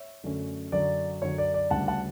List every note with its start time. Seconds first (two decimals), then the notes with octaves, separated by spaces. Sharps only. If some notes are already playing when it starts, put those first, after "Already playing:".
Already playing: C#5 E5
0.24 F#2 D3 A3 C#4
0.72 F#2 D3 F#3 D5
1.22 F#2 D3 F#3 C#5
1.38 D5
1.54 D5
1.70 D2 C#3 G3 D4 F#5 A5
1.88 F#5 A5